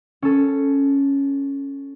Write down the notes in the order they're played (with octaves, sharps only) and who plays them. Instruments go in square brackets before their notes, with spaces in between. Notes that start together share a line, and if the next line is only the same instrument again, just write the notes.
[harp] C#4 A4